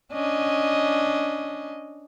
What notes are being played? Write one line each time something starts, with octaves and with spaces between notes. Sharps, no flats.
C#4 D4 D#5